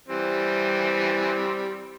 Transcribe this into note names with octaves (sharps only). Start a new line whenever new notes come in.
E3 G3 C4